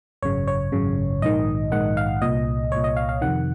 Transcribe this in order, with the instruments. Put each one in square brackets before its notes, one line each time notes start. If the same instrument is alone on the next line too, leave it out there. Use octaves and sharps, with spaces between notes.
[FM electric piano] G#1 F#2 C#3 C#5
C#5
G#1 F#2 C#3
A#1 G#2 D#3 D#5
A#1 G#2 D#3 F#5
F5
C2 A#2 D#5
C2 A#2 C#5
D#5
F5
F5
F2 C3 D#3 F#5